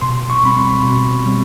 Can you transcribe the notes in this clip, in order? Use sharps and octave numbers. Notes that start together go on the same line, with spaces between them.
B2 C6
C#6
G3 C4 B5
C6
B2
G3 C4